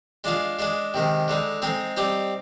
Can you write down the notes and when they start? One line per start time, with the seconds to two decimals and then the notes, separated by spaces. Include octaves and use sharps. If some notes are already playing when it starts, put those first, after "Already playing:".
0.24 G#3 D4 F4 G#4
0.59 G#3 D4 G#4
0.94 C3 D#3 G#3
1.28 D3 G#3 D#4
1.62 G#3 C4 D#4 G#4
1.97 G3 C4 D#4 G4